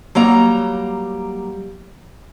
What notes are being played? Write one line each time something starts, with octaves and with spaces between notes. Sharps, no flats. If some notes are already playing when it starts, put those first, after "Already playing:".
F#3 G3 A#3 A#5